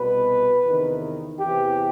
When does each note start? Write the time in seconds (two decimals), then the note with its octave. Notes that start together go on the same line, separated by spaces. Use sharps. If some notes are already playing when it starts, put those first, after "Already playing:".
Already playing: C2 B2 B4
0.63 E2 C3 D#3
1.39 E2 C3 E3 G4